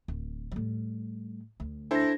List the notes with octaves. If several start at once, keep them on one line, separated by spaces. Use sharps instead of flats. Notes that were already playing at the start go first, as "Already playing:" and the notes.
D1
A2 G3
D2
D4 E4 A4 C5 A#6